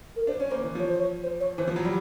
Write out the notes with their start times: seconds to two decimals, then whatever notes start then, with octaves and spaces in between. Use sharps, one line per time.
0.16 A#4
0.27 D4 C5
0.40 C#4 C#5
0.51 A#3 C5
0.63 E3
0.75 F3 C#5
0.88 C5
0.98 C#5
1.23 C5
1.40 C#5
1.58 E3 C5
1.67 F3
1.76 F#3
1.85 G3